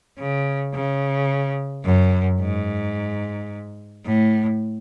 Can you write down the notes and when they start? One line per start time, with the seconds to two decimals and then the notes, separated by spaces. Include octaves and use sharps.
0.18 C#3
0.73 C#3
1.84 F#2
2.40 G#2
4.06 A2